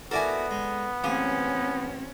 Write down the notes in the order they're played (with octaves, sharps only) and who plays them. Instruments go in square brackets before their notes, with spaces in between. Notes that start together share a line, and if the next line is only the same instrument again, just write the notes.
[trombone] B3 [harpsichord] E4 F#4 A#4 [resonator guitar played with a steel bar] A4 D5 G#5
[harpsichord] G#3
[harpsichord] A1 G#4 [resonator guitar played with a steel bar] A#3 [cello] C4 C#4